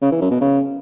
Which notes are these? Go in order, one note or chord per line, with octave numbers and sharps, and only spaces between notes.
C#3
E3
F#2
B2
C#3